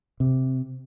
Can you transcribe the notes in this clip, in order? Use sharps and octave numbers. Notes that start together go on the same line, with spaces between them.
C3